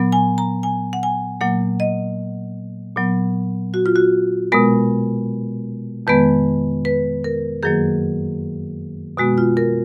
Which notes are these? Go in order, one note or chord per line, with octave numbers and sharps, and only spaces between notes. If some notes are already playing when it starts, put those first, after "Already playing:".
Already playing: A#2 F#3 B3
G#5
A#5
G#5
F#5
G#5
A#2 F#3 A#3 F#5
D#5
A#2 F#3 B3
F#4
F4
F#4
B2 G#3 B3 A#4
F2 D#3 G#3 B3 B4
B4
A#4
F#2 D#3 F#3 A#3 G#4
B2 G#3 B3 F#4
F4
A#4